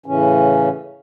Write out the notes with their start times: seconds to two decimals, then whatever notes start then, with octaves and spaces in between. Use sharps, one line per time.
0.06 A2 C#3 E3 C#4